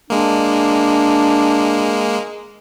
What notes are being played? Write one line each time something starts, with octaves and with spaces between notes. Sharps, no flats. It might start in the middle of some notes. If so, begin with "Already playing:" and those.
G#3 A#3 D4